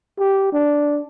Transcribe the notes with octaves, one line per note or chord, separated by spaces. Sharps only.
G4
D4